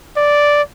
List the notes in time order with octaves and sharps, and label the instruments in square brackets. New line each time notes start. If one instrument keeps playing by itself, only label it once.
[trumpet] D5